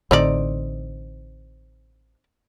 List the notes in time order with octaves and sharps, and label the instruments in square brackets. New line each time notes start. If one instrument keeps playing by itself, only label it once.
[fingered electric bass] A1 A2 D3 [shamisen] C4 D#4 D5